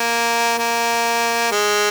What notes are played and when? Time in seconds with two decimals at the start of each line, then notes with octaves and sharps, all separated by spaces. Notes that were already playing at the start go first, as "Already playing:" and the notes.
Already playing: A#3
0.59 A#3
1.52 G#3